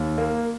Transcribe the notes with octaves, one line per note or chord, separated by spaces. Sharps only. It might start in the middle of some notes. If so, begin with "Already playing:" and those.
Already playing: D#2
A#3